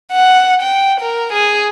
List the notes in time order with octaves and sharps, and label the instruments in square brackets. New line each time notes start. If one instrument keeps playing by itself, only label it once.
[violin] F#5
G5
A#4
G#4